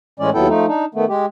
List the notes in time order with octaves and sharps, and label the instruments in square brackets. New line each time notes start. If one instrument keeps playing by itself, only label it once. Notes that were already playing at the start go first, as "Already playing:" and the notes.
[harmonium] A2 E3 G#3 C#4 D5
D#2 F#3 B3 E4 A4 G5
F3 A3 D#4
D4 D#4
D#3 A3 B3
G#3 G4